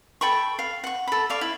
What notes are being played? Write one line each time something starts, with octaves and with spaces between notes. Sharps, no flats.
A4 G5 B5 C#6
F5
F#5 C#6
A4 B5
D5 F5 C#6
E4